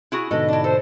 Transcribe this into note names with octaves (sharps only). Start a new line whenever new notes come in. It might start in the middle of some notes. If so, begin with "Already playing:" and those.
E4 F#4 G#4
G#2 B2 D3 A4 B4 D#5
D4 E4
A4 C5